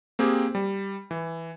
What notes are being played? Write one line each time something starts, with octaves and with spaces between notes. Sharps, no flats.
A#3 C4 G4 G#4
G3
E3